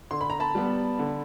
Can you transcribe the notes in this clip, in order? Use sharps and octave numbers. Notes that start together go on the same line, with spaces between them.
D3 C6
B5
A#5
A5 B5
G3 B3
D3